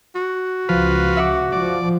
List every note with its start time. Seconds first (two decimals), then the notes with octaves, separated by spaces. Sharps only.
0.16 F#4
0.69 C#2 F3 F4 B4
1.17 E5 F#5 D6
1.52 F3 D5